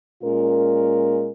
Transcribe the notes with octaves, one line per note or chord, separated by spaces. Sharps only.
A#2 G#3 C#4 F4 A#4